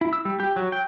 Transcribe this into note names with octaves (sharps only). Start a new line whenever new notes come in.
E4
E6
G3
G4
F#3
G5